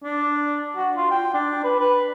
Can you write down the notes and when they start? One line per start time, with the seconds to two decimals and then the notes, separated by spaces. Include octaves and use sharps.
0.04 D4
0.77 F#4
0.97 F4
1.11 G5
1.34 D4
1.64 B4
1.80 B4